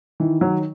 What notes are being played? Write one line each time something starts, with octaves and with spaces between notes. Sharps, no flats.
D#3 E3
F#3